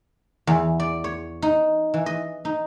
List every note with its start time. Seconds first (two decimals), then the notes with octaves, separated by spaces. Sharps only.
0.47 E2
0.80 D5
1.04 C#5
1.42 D#4
1.94 E3
2.06 D#5
2.45 D#4